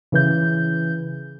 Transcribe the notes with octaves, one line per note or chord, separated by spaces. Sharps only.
C#3 E3 G6